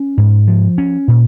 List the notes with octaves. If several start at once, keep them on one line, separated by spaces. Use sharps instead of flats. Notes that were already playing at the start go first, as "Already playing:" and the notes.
Already playing: C#4
G#2
F3
C#4
A#2